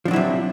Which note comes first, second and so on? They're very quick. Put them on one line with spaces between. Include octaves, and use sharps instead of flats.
F3 D4 F#3 E4 C3